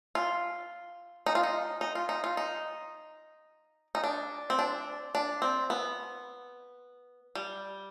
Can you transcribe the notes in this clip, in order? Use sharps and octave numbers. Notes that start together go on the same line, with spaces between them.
F4
D#4
F4
D#4
D#4
F4
D#4
F4
D#4
D#4
D4
C4
D4
D4
C4
B3
G3